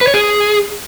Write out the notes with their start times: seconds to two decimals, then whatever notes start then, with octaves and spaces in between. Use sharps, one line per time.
0.01 B4
0.08 C#5
0.14 G#4